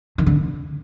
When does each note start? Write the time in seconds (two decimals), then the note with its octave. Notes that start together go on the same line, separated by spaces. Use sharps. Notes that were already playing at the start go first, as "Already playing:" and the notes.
0.18 D#3
0.26 D3